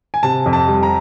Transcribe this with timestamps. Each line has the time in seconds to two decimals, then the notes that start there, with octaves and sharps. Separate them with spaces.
0.14 G#5
0.23 C3 A5
0.46 F2
0.53 A5
0.68 G3
0.83 A#5